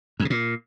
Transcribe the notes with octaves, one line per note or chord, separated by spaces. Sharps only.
F2
B2
A#2